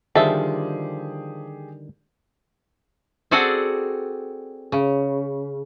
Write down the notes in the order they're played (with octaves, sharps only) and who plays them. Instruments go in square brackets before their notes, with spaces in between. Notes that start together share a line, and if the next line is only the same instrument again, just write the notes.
[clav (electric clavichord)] D3 D#3 G3 [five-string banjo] F3 E5 A5 [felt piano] G4 G#4
[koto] C4 F#4 G#4 A4 D5 F#5
C#3